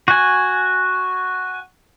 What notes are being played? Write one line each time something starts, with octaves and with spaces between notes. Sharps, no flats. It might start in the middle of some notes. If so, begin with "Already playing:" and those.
F#4 G#5